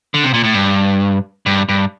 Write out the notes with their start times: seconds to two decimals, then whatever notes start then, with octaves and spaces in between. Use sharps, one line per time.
0.14 D3
0.24 C3
0.34 A#2
0.44 A2
0.54 G2
1.46 G2
1.69 G2